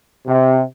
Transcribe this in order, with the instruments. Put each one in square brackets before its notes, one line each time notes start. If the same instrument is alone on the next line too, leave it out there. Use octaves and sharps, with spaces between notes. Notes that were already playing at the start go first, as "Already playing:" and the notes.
[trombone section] C3